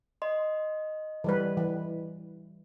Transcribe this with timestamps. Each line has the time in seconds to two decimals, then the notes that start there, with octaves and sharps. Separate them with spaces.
0.22 D#5 C6
1.24 E3 G3 B4
1.57 E3